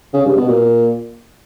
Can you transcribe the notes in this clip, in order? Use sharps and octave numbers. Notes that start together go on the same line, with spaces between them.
C#3
G2
B2
A#2